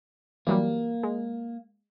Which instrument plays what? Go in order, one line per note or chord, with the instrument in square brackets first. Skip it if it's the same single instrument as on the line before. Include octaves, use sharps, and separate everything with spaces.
[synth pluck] E3 F#3 G3 [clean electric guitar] A#3
[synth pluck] G#3